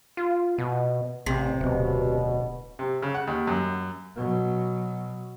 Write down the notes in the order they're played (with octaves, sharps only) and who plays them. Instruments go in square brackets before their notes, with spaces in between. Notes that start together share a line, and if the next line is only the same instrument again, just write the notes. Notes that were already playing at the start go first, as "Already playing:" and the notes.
[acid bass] F4
B2
[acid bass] A1 [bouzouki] C3
[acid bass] D1 [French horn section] B2
[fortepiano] C3
C#3
F#5
D#2
F#2
[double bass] B2 F#3